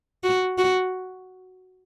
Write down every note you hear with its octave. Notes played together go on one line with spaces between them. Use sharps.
F#4
F#4